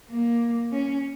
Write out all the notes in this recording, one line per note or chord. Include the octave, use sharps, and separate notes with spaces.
A#3
C#4